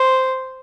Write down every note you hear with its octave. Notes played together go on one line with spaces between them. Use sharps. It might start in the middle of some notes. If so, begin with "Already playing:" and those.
Already playing: C5